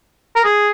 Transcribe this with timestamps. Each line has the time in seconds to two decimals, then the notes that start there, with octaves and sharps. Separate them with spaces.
0.36 A#4
0.45 G#4